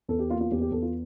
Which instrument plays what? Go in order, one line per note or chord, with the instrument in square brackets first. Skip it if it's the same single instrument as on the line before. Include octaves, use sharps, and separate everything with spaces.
[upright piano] E2 A4
G4
A#3 F4
F4
E2 G4
G4
E2 A4
F4